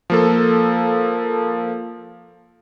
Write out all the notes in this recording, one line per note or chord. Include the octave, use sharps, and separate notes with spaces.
F3 A#3 A4